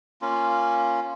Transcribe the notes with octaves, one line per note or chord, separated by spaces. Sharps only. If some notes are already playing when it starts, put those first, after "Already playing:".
A#3 C#4 F4